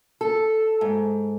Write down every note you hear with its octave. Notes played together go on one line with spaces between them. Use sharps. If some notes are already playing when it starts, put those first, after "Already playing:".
A4
G#2